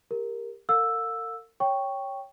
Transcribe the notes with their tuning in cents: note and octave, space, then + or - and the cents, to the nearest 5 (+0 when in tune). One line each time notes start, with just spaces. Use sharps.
G4 +25 A#4 +0
A#4 -45 F5 +35 E6 +0
C#5 +0 G5 +0 C#6 +0